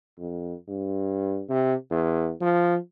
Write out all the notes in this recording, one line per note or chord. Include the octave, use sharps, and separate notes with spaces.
F2
G2
C3
E2
F3